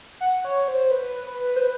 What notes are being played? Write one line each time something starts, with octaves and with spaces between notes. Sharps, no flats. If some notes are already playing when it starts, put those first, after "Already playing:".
F#5
C#5
C5
B4
B4
C5
B4